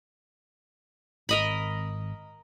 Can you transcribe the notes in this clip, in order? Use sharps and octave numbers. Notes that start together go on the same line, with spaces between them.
G#1 A#4 D#5 B5